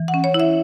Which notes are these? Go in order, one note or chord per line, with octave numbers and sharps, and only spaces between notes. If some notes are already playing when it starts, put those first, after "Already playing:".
Already playing: E3
F#5
C#4
C#5
E4
E5